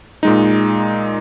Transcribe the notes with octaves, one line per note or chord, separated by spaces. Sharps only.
A#2 G#3 D#4